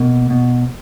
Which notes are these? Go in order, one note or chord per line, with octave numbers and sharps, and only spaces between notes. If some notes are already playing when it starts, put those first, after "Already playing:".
Already playing: B2 A#3
B2